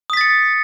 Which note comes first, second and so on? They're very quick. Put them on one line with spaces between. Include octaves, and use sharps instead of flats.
D#6 B6 A6 C#7